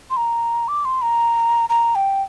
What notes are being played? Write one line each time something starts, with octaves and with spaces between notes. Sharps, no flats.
C6
A#5
D6
C6
A#5
A#5
G5